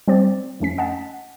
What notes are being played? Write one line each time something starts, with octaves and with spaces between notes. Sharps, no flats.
G3 C4 C5 D5
F2 A3 C#4 B6
D#5 F#5 G#5 A5